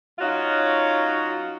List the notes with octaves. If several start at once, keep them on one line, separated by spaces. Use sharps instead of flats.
F#3 C#4 D#4 F4 F#4